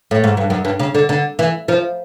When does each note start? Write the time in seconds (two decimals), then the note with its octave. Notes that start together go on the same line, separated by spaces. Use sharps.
0.11 A2
0.24 G#2
0.37 G2
0.50 F#2
0.65 G2
0.79 C#3
0.95 D3
1.09 D3
1.39 E3
1.68 F3